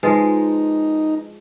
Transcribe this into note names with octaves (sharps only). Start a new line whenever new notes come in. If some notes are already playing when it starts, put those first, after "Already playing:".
F3 G#3 D#4 B4 A6